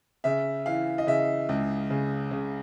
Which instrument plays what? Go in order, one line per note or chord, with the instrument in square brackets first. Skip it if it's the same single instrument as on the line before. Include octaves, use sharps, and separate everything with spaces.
[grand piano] C#3 E5
E3 F5
D#5
C#3 E5
C#2
C#3
C#3